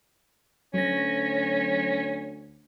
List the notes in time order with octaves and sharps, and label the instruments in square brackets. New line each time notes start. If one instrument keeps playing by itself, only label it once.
[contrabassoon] D2 [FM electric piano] F#3 A#6 [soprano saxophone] C#4